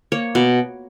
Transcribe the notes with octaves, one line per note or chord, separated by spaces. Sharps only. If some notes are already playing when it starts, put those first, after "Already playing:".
A#3 C#5
B2